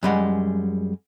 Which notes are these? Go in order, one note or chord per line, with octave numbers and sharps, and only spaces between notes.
F#2 G3 G#3 F#5